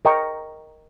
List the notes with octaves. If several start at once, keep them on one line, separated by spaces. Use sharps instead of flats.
A#4 D#5 G5 A#5 C#6